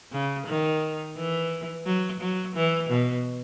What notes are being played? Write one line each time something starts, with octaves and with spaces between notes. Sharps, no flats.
C#3
D#3
E3
F#3
F#3
E3
B2